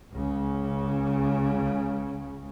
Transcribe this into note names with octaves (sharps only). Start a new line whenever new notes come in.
C#2 C#3